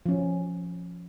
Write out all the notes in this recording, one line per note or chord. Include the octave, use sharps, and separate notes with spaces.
F3 C#4